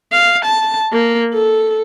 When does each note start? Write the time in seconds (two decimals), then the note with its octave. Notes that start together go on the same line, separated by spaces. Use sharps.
0.12 F5
0.45 A5
0.93 A#3
1.34 A4